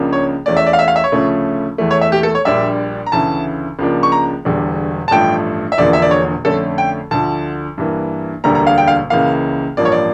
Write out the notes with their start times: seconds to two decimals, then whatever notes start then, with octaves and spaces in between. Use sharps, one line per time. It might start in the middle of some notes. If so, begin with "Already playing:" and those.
Already playing: C#2 C#3 F3 A#3 D4
0.13 C#5
0.46 E2 E3 A3 C#4 D5
0.57 E5
0.67 D5
0.73 F5
0.79 E5
0.88 F5
0.96 E5
1.04 C#5
1.12 D2 C#3 F3 A3 C#4
1.78 E2 E3 A3
1.91 C#5
2.01 E5
2.12 G4
2.23 A4
2.35 C#5
2.45 A#1 A#2 G3 D4 E5
3.06 A#5
3.12 D2 C#3 E3 A5
3.79 C#2 C#3 F3 A#3 D4
4.03 C#6
4.12 A#5
4.45 E1 E2 D3 G3
5.08 A5
5.11 A1 G2 F3 A3 G5
5.72 E5
5.78 E1 E2 D3 F3 A#3 D5
5.93 E5
6.02 D5
6.11 C#5
6.45 F2 D3 A3 C#4 A4
6.78 G5
7.11 D2 D3 F3 A5
7.78 G2 E3 A#3
8.44 E1 D2 D3 G3 A#3 A#5
8.55 A#5
8.67 F5
8.78 G5
8.88 F5
9.10 C#2 C#3 E3 A#3 F5
9.77 A1 G2 F3 A#3 D5
9.85 C#5
9.92 D5